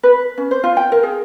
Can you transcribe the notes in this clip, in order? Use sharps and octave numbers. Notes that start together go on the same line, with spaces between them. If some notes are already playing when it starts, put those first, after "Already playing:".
B4
C#4
C5
F4
G5
A#4
G#4